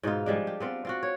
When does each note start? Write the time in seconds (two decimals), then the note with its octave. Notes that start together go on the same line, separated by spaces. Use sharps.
0.03 G#2 B2 D#4 F4
0.26 F3 G3 G#3 D4
0.47 G4
0.60 B3 C4 F4
0.85 C4 F4 F#4
1.03 C#5